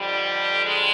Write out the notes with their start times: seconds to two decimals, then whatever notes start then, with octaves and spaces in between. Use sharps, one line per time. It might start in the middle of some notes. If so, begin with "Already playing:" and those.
Already playing: F2 D3 G3
0.64 G#3